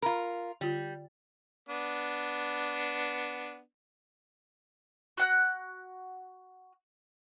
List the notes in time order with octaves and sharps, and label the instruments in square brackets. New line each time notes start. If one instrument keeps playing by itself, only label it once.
[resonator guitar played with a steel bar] F4 A#4 [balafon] B5
[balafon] D3 F4 [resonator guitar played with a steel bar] G3
[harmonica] B3 D4
[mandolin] F#4 F#5 F#6